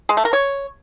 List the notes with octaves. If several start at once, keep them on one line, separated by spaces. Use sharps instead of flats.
G#3
A3
A#4
C#5